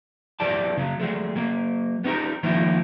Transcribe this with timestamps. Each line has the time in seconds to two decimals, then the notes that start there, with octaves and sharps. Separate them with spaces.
0.40 B1 F#3 E4 G4 D5 A5
0.77 C#3 F#3
1.00 F#3 G#3 A3
1.36 F#3 A#3
2.04 B3 C#4 D#4 E4 G4 A#4
2.43 D#3 F3 G#3 A#3 D#4 E4